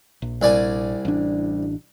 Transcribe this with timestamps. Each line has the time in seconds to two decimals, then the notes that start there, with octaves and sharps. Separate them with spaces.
0.22 A#1
0.42 C2 D5 G#5
1.05 A1 D4